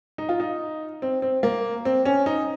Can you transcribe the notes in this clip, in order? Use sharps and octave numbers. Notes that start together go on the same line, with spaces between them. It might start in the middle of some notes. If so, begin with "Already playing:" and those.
D#4
F4
D#4
C4
C4
A#3
C4
C#4
D#4